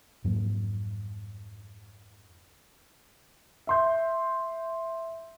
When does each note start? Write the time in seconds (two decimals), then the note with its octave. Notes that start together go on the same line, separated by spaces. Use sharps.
0.24 F2 G#2 F#3 A#3
3.67 E5 C6 G6